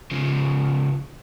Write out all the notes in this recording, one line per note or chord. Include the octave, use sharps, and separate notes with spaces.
C#3 F3